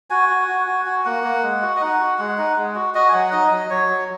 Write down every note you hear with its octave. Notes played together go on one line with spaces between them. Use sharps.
F#4 G#5
F#4
F#4
F#4
F#4
A#3 F#5
A#3
G#3
F#4
D#5
D#4 F#5
F#4
G#3 F#5
D#4
G#3
F#4
F#4 D#5
G#5
F#3 F#5
D#4 D#5
F#3
F#3 C#5
F#3